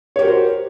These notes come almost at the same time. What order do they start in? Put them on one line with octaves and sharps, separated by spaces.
C#5 G4 A#4 F#4 C5